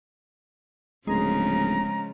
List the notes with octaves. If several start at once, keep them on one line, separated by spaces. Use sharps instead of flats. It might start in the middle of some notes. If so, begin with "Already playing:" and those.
D1 C#3 F3 G#3 A#5